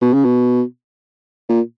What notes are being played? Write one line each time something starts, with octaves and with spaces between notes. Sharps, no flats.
B2
C#3
B2
A#2